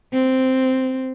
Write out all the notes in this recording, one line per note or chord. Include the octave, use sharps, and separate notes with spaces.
C4